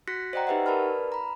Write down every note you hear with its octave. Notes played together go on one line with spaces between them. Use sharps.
F#4 F#6 A#6 B6 C#7
C5 D5 D#5 F#5 G5 A#5
D#4 G4 B4 E5 F#5
A#4 B4 D5 A5 B5 F6
A#5 B5